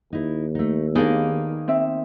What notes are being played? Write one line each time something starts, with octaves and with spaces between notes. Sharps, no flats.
D#2 D#4 E4
A3 D#4
D#3 A#3 B3 D4 G#4
C4 E5